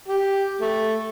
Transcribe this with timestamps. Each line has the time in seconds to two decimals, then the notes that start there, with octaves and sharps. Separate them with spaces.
0.08 G4
0.61 A3